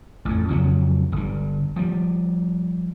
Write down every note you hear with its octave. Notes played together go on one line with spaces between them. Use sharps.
A1 F2
F2 C#3 F3 F#3
G1 G2
F3 G3